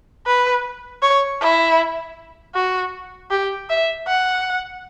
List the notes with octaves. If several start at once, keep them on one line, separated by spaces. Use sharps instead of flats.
B4
C#5
E4
F#4
G4
E5
F#5